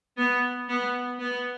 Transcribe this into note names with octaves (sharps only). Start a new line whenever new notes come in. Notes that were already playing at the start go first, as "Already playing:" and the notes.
B3
B3
B3